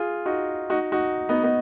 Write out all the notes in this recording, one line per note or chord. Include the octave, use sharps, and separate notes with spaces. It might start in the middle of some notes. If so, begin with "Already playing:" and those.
Already playing: F4 G#4
D#4 F#4
D#4 F#4
D#4 F#4
B3 D#4
B3 D#4